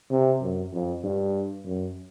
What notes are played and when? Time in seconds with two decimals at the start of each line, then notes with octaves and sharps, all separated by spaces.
0.10 C3
0.41 F#2
0.72 F2
1.04 G2
1.66 F#2